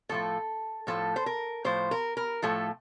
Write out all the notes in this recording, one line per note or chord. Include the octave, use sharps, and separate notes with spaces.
A2 F3 A3 A4
A2 F3 A3 A4
C5
A#4
A2 F3 A3 C5
A#4
A#4
A2 F3 A3 A4